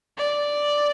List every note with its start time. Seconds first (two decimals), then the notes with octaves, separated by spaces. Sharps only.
0.18 D5